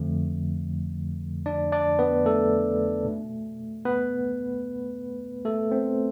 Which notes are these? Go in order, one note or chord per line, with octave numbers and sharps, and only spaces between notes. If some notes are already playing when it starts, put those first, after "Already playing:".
Already playing: F2 D3 F3 A3
D4 D5
D4 D5
B3 B4
A3 A4
B2 A3
B3 B4
A3 A4
C4 C5